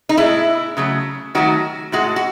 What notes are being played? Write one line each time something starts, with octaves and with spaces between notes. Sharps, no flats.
D#4
A2 G#3 E4
C#3 F#3 A3
D#3 F#3 A3 F#4
A2 G#3 F#4
F#4